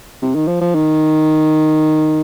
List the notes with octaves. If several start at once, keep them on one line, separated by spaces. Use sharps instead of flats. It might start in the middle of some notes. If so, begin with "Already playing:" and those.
C3
D#3
F3
F3
D#3